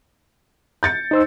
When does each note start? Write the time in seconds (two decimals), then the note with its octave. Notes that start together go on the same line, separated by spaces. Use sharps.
0.83 G6 A6 C#7
1.11 D#4 C5 E6